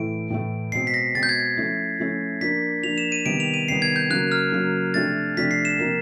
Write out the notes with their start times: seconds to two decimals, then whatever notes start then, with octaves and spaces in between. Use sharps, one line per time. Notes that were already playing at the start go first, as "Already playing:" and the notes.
Already playing: A2 E3 A3 D7
0.30 A2 E3 A3
0.72 B2 G#3 C4 C7
0.87 B6
0.94 A#6
1.15 B2 G#3 C4 A6
1.23 G6
1.29 G#6
1.57 F3 A3 C#4 E4
2.00 F3 A3 C#4 E4
2.41 F3 A#3 D4 B6
2.83 F3 A#3 D4 F7
2.98 E7
3.12 D#7
3.25 C3 D#3 G3 B3 D7
3.40 F7
3.54 D#7
3.68 C3 D#3 G3 B3 C7
3.82 G#6
3.96 G6
4.10 C#3 F#3 A#3 F#6
4.32 F6
4.52 C#3 F#3 A#3
4.94 C3 F3 A3 D4 A6
5.37 C3 F3 A3 D4 B6
5.51 C7
5.65 E7
5.79 C3 F3 A#3